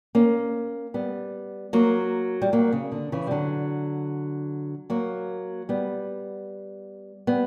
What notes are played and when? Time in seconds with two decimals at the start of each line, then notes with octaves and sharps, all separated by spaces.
0.15 A#3 C#4
0.94 G3 B3
1.73 F#3 A#3
2.42 G3
2.53 F#3 A#3
2.72 C#3
2.92 D3
3.12 C#3 E3
3.27 G3
3.31 D3 F#3
4.90 F#3 A#3
5.69 G3 B3
7.27 G3 B3